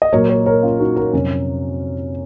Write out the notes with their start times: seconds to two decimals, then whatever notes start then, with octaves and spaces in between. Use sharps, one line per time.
0.02 D#5
0.12 A#2 F#3 A#3 A#4 C#5
0.29 A#4 C#5
0.46 A#4 C#5
0.63 C#4 F4
0.79 D#4 F#4
0.96 F#4 A#4
1.13 F2 C3 F#3 C#4